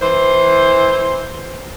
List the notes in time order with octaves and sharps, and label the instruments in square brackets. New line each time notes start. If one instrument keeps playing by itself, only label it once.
[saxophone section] E3 C5